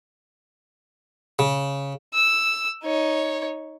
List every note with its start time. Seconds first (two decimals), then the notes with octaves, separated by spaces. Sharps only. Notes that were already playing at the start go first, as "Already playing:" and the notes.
1.39 C#3
2.13 E6
2.84 D#4 C#5